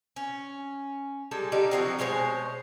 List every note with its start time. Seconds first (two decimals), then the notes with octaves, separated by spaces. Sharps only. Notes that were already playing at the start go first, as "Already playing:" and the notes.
0.16 C#4
1.31 G3 G#3 A4
1.52 D3 G3 D4 D#4
1.71 F3 F#3 C4
1.99 B2 G#3 C5 C#5